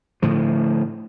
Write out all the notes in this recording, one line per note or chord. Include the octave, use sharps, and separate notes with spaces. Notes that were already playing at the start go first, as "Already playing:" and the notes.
A2 D3 F3